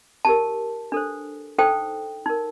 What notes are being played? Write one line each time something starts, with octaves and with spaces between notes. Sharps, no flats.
D#4 G4 A#4 A5
D4 A4 C5
D#4 A4 C5 G5
D#4 A#4